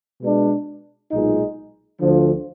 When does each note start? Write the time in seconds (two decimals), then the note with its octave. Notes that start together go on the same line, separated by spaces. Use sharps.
0.21 B2 G#3 D4
1.10 B1 A#2 G#3 D#4
1.99 D2 D3 F3